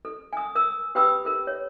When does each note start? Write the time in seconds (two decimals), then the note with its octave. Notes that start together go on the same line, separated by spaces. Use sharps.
0.05 A4
0.33 G#5 D#6
0.55 A#4 D#6 E6
0.95 G4 B4 G5 B5 D#6 E6
1.25 A4 A#4
1.47 C#5